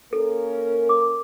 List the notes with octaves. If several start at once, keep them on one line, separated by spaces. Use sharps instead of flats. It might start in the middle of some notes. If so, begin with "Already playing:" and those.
A#3 C#4 A4 A#4
D6